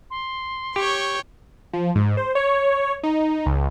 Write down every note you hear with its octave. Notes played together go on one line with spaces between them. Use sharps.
C6
G4 C#5 G5 C#6
F3
G#2
C5
C#5
D#4
C#2